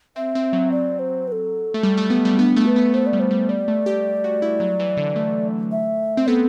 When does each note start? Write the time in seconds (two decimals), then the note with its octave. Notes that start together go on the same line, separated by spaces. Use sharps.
0.16 C4 E5
0.35 C4
0.53 F#3
0.72 D5
0.99 C5
1.28 B4
1.32 A4
1.74 A3
1.83 G3
1.97 A3
2.10 B3
2.25 G3
2.38 B3 D4
2.57 A3
2.66 B4
2.76 B3
2.94 A3 C5
3.06 D5
3.13 G3
3.20 C5
3.31 G3
3.49 G3 D5
3.68 A3
3.86 G4
4.24 F#4
4.42 E4
4.60 F#3
4.80 E3
4.97 D3
5.16 A3
5.72 E5
6.17 C4
6.27 B3 A4